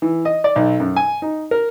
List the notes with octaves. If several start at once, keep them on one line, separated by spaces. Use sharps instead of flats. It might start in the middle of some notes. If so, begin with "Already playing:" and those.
E3
D#5
D5
B1
F#2
G#5
D#4
A#4